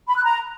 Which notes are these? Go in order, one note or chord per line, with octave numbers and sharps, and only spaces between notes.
B5
F#6
A#5